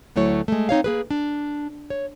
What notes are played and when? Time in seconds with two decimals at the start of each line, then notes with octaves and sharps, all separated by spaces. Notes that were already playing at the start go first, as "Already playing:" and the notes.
0.16 D2 F#3 A3 E4 C#5
0.48 G#3 A3
0.69 C4 D#4 C#5 F5
0.84 A#3 G#4 B4
1.10 D4
1.90 C#5